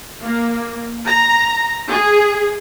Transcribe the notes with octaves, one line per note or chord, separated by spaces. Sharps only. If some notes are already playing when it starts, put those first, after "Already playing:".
A#3
A#5
G#4